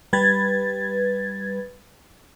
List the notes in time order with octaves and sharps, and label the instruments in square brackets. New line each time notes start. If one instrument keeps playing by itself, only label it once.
[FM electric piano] G3 B4 G#6 A6